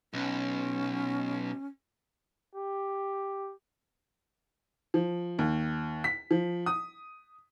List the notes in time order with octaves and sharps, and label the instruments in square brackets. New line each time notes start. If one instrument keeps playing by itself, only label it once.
[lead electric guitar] B1 [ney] C#4
[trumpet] G4
[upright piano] F3
D#2
B6
F3
D#6